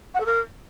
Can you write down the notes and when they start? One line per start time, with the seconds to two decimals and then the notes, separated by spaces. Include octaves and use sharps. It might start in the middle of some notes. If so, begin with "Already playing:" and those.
0.14 F#5
0.20 A4
0.25 A#4